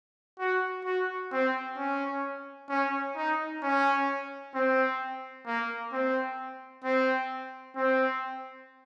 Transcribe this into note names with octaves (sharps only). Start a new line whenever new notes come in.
F#4
F#4
C4
C#4
C#4
D#4
C#4
C4
A#3
C4
C4
C4